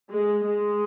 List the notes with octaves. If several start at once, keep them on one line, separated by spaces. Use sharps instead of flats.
G#3
G#3